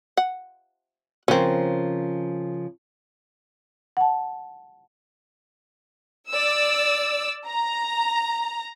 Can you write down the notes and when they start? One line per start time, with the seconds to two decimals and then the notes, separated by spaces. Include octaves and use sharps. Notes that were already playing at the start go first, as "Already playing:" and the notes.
0.17 F#5
1.28 C#3 F3 C4 C#4 A#4
3.97 F#5 A5
6.30 D5 E6
7.48 A#5